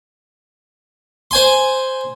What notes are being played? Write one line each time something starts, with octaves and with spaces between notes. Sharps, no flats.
C5 G#5 C6